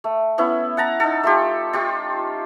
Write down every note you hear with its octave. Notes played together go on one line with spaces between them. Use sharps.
A3
B3 C#4 E4
F#5 A5 A#5
D#4 A4
A3 F4 G4
F4 G4 C#6